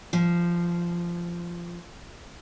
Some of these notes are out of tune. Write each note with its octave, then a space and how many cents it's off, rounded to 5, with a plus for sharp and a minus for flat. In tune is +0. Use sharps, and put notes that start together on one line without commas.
F3 -15